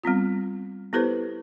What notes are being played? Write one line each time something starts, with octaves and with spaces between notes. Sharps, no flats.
G3 B3 C4 F4
B3 E4 G4 A4 B4 C5